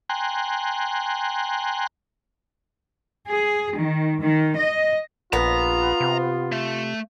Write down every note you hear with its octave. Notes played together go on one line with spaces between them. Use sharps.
G5 G#5 A#5 C6 F#6
G#4
D#3
D#3
D#5
A#1 B3 F4 A#5
C3
A3